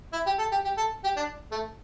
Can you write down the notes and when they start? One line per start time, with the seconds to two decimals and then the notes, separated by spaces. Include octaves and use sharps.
0.13 E4
0.26 G4
0.38 A4
0.52 G4
0.64 G4
0.77 A4
1.04 G4
1.16 D4
1.52 A3